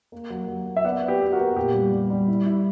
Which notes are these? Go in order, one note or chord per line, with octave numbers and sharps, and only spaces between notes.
A#3
F#3
F#3
A#3
E5
B3 D5 F#5
B3
G4 B4
B3
G4
F#4 A#4
B3
A#2 G4
G3
G3
G3
E4
E4